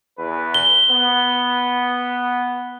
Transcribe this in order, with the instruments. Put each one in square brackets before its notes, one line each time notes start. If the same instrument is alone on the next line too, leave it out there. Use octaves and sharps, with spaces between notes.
[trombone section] E2 B4
[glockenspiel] G7
[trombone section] B3